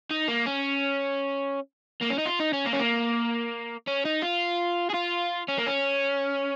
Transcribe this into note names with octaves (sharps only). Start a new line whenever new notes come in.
D#4
A#3
C#4
A#3
C#4
D#4
F4
D#4
C#4
A#3
C#4
A#3
C#4
D#4
F4
G#4
F4
C#4
A#3
C#4